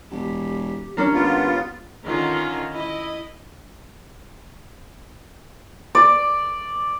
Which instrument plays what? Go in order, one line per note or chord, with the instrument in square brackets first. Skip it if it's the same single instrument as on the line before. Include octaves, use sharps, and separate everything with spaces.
[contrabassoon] E1 [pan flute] G4
[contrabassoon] D#2 [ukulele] C#4 D4 A#4 [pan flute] G4
[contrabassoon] G#1 [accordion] B3 F4
[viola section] D3 D#3 C#4 F4 A#5
E4 D#5
[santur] D5